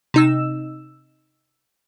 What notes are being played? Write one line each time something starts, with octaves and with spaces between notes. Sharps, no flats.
C3 D#4 E6